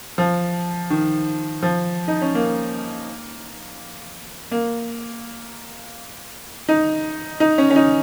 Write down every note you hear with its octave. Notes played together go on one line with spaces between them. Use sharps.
F3
D#3
F3
D#4
C#4
A#3
A#3
D#4
D#4
C#4
C#4
D#4